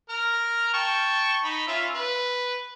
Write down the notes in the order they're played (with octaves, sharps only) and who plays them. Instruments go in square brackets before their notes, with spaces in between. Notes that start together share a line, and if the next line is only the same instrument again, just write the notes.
[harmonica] A#4 A#5 F6
G5 A5 C#6
D#4 B5
C#4 F4 E5
B4